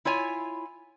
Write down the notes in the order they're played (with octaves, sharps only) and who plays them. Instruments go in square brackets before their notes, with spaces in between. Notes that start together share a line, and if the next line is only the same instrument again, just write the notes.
[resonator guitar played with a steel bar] E4 F4 C#5 G#5